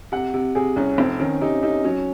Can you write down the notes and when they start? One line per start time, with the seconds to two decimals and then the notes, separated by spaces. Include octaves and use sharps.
0.12 C3 F#5
0.34 C3
0.55 C3 G#4
0.76 C2 C#4
0.98 F1 C4
1.20 D#3 C#4
1.41 C3 D#4
1.63 C3 D#4
1.84 F#3 C#4